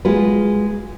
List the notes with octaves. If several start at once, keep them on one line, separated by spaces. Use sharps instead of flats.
G#3 F4 F#4 B4